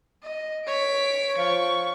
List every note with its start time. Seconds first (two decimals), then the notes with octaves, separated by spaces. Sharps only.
0.22 D#5
0.66 C#5 B6 D7
1.38 F3 C#6